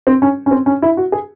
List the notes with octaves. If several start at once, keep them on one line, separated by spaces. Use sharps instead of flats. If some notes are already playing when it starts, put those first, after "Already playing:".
C4
C#4
C#4
C4
C#4
E4
F#4
G#4